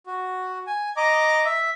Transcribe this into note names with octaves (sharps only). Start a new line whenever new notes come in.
F#4
G#5
D#5 A#5 D6
E5